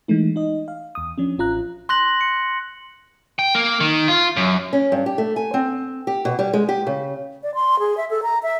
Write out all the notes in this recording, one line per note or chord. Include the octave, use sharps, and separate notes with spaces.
E3 G#3 A3 D#4
D#4 D#5
F5
E2 D#6
F3 C#4 D4
A1 F4 A#5 F#6
C6 F#6 A#6 F#7
C#7
G5
A#3
D#3
F4
F#2
C#4
G2
G4
A3
G#5
C4
G4
B2
G3
G#3
G4
C#3
D5
C6
G#4
E5
A4
A#5
E5